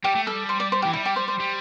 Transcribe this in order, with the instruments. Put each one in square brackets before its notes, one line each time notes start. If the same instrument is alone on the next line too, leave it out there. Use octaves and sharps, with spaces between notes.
[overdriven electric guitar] G3 [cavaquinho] G4
[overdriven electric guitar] A3
[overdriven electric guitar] G3 [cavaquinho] A4
[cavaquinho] C5
D5
C5
G4
[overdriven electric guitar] E3
[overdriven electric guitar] G3 [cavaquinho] E4
[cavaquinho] G4
C5
C5
[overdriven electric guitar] G3